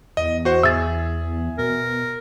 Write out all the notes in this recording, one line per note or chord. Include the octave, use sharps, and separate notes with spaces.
E2 D#5
F#4 C5 F#5
G#4 E5 E6 A6
B2 A#4